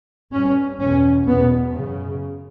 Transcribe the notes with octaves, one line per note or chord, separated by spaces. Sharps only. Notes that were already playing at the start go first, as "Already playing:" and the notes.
G2 C#4
E2 B2 C#4
E2 B2 B3
F#2 C#3